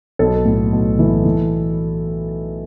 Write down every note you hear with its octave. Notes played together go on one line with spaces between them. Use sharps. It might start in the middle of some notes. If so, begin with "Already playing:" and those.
B1 A4
A2
B1
E3
E3